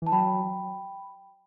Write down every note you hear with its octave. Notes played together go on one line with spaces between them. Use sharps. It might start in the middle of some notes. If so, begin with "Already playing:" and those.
E3 A5
F#3 G5 B5